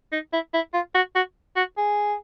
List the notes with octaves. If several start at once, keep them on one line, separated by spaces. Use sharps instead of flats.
D#4
E4
E4
F4
F#4
F#4
F#4
G#4